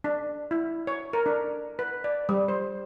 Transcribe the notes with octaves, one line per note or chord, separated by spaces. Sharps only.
D4
E4
C#5
A#4
D4
B4
D5
G3
C5